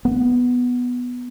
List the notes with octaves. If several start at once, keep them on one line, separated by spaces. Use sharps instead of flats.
B3